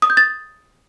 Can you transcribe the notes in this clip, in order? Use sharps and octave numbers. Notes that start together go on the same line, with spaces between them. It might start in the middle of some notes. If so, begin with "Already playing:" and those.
D#6
G6
A6